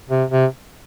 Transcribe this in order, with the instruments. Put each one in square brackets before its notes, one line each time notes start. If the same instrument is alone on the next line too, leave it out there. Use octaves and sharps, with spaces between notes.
[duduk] C3
C3